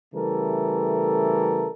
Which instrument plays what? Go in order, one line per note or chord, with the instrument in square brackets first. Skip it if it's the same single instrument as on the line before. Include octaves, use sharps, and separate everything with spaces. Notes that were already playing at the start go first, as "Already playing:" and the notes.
[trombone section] C#3 E3 G3 A3 A4 A#4